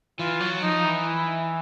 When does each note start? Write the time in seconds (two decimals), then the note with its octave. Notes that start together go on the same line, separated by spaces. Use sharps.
0.19 E3 F4
0.40 F#3
0.63 F3 D#4
0.84 E3
1.05 E4